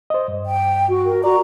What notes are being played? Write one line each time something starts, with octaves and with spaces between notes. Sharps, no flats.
C5 D#5
G2
G5
F#4
A#4
F#4 D5 A#5